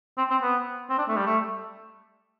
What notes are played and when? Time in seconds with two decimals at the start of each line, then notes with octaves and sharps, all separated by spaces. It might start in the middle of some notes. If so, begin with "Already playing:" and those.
0.18 C4
0.30 C4
0.42 B3
0.90 C4
0.98 D4
1.08 A3
1.16 G3
1.26 A3